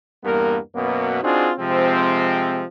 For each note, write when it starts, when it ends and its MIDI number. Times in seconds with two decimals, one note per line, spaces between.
0.24 0.57 40
0.24 0.57 43
0.24 0.57 55
0.24 0.57 58
0.24 0.57 59
0.24 0.57 70
0.75 1.21 42
0.75 1.21 47
0.75 1.21 58
0.75 1.21 59
1.23 1.50 60
1.23 1.50 62
1.23 1.50 63
1.23 1.50 65
1.23 1.50 66
1.23 1.50 68
1.58 2.63 48
1.58 2.63 53
1.58 2.63 56
1.58 2.63 60